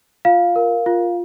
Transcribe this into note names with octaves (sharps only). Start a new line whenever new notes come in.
F4 F5
A#4
F4